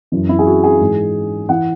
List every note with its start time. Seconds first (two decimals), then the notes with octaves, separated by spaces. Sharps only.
0.12 F#2 E3
0.29 E4
0.39 G#4
0.46 F#4
0.64 G#4
0.81 G#2 E3
1.49 E3 F#5